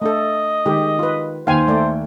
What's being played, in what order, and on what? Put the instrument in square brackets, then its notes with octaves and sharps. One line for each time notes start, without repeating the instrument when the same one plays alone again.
[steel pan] A3 D4 A4 [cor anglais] D#5
[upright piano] D#3 [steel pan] G#3 G4 G#4
[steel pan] F4 B4
[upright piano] D#2 G5 [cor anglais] C5 [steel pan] F5 G#5
[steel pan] A3 D5